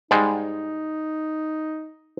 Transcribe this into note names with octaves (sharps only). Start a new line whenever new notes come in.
G#2 G3 G#3 D#4